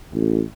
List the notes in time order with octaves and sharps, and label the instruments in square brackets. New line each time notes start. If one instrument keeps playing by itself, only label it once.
[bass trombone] A1